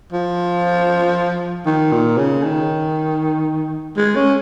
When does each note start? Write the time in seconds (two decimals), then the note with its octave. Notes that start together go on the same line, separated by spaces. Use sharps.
0.12 F3
1.66 D#3
1.92 A#2
2.18 C#3
2.44 D#3
3.97 G#3
4.16 C#4